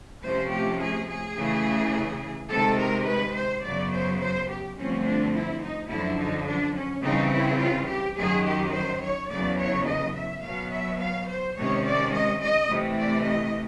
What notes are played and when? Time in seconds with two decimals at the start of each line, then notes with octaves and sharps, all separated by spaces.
0.25 C3 F3 A3 C#4 C5
0.52 G4
0.80 G#4
1.08 G#4
1.37 C#3 E3 A3
2.50 C3 D#3 G#3 A4
2.79 A#4
3.07 B4
3.35 C5
3.63 F#2 C#3 F#3 B3 D5
3.92 C5
4.20 C5
4.49 G4
4.77 G2 D3 F3 A3 C4 C#4
5.05 D4
5.33 E4
5.62 D#4
5.90 F#2 D3 F3 E4
6.19 D#4
6.47 D4
6.76 C#4
7.03 C#3 E3 G3 C4 D#4
7.32 E4
7.59 F4
7.88 G4
8.17 F#2 D#3 F#3 G#4
8.44 G4
8.74 C5
9.01 C#5
9.30 E2 C#3 F#3 D5
9.58 C#5
9.86 D#5
10.14 E5
10.43 B2 F#3 B3 F5
10.71 E5
11.00 F5
11.29 C5
11.56 C3 D#3 G#3 C#4 C#5
11.85 D5
12.13 D#5
12.41 D#5
12.70 C3 E3 A3
12.98 D5
13.26 D#5